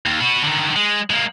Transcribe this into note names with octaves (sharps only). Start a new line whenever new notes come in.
D#2
B3 F#4
D3 D#3
G#3
G#3 A#3